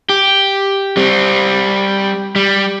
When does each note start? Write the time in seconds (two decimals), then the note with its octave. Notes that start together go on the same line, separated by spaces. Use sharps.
0.10 G4
0.97 G3 C4
2.36 G3